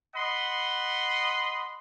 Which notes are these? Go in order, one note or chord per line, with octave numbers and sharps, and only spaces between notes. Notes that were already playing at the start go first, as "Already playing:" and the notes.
D#5 F#5 B5 C6